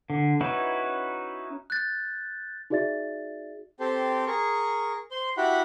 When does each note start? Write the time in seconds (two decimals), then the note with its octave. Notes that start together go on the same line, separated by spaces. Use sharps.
0.10 D3
0.41 C#4 D#4 E4 F#4 B4
1.70 F#6 G6 A6
2.70 D#4 F#4 G#4 D5 E5 A6
3.80 C4 G4 A4 C5
4.27 G#4 A#4 C#6
5.11 C5 C6
5.37 E4 F#4 G4 F#5 B5